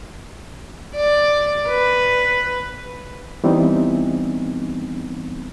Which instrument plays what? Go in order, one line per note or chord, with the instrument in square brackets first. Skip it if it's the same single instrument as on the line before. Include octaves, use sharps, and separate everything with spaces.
[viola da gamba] D5
B4
[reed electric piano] E3 G3 B3 C4 D#4